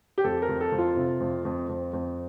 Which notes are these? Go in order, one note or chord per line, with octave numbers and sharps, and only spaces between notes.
G4
F2 A4
A#4
F2
A4
F2
F4
C3
F2
F2
F2
F2